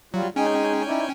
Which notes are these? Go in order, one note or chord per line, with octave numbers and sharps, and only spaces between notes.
F#3 G3 F4
G#3 C#4 D#4 G#4 G5 G#5
D#4 E4 D5